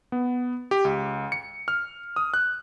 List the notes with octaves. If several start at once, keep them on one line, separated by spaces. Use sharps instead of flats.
B3
G4
C#2
C#7
F6
D#6
F#6